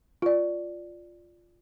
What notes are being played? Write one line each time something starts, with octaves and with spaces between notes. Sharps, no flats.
F4 D5